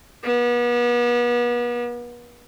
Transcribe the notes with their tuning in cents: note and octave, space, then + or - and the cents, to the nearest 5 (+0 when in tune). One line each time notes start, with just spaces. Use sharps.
B3 -35